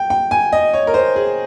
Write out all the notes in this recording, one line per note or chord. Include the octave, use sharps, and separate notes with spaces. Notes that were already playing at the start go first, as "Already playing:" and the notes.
Already playing: G5
G5
G#5
D#5
C#5
A#4
C5
G#4